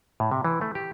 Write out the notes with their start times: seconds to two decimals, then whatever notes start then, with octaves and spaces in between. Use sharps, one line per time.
0.20 A2
0.31 C3
0.45 E3
0.61 A3
0.75 G4